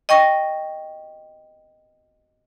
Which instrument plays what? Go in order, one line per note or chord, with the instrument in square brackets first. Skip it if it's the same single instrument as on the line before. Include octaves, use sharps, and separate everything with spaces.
[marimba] D#5 G5 C#6 A#6